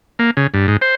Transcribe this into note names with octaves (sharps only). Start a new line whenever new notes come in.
A#3
C#3
G2
G#2
C5